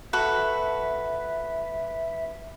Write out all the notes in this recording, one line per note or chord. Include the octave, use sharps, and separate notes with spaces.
F#4 A4 B4 E5